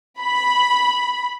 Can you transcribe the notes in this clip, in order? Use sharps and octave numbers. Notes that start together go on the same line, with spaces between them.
B5